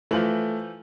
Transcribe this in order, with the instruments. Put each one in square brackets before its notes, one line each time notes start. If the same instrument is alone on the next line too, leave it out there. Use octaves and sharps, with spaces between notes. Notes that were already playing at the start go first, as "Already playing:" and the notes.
[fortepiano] E3 F3 F4 [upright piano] A3 F#7